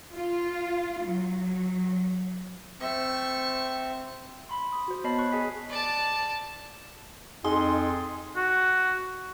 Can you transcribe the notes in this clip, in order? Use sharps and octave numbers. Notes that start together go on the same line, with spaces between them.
F4
F#3
A3 C4 E5 C#6
B5 C6
D#6
F#4 C5
B3 C#5 D#5 A5 B5 C7
C#6 F#6
G#4 D#5 G#5 B6
D5 A5
F2 D#4 G#4 C6
F#4